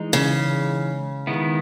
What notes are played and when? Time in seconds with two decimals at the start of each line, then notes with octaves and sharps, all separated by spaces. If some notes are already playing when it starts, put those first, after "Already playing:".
Already playing: E3 G#3 D#4
0.13 C#3
1.27 D#3 G#3 B3 E4